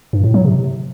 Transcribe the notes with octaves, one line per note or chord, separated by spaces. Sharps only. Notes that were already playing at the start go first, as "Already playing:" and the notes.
G2
A2
F#3
C3